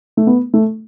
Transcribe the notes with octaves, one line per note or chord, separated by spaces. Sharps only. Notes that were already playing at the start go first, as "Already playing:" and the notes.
A3
B3
A3